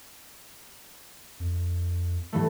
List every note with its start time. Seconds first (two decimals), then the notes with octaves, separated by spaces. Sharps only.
1.40 F2
2.33 G2 E3 A3